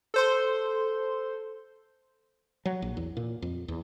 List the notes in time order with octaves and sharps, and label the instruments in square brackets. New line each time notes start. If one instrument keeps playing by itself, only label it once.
[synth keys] A4 C5 C6
[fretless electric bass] F#3
A#1
E2
A#2
F2
E2